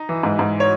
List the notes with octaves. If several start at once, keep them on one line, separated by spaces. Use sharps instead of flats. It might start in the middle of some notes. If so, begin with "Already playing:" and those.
Already playing: D#4
E3
G#2
G#2
C#5